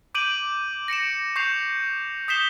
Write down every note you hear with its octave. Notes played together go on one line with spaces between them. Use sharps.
D6 G6 D7 D#7 F#7
A#6 C#7 D7 E7
C#6 G6 C7 F7
D#6 G6 B6 C7 E7 G7